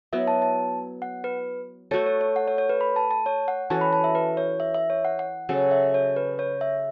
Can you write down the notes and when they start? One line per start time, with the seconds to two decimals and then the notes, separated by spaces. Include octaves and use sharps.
0.13 F#3 B3 E4 E5
0.28 A5
0.42 A5
1.02 F#5
1.24 B4
1.91 A3 F#4 A4 C#5
2.06 C#5
2.21 C#5
2.36 F#5
2.48 C#5
2.58 C#5
2.69 B4
2.81 B5
2.96 A5
3.11 A5
3.26 C#5
3.48 F#5
3.70 E3 C#4 F#4 A4 A5
3.81 B5
3.93 A5
4.04 E5
4.15 B4
4.37 C#5
4.60 E5
4.74 E5
4.90 C#5
5.05 F#5
5.19 F#5
5.49 C#3 F#3 C#4 A4 F#5
5.71 E5
5.94 C#5
6.16 B4
6.39 C#5
6.61 E5